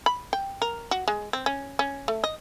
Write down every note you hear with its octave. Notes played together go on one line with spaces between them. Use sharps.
B5
G5
A#4
F#4
G#3
C4
C#4
C#4
A3
D#5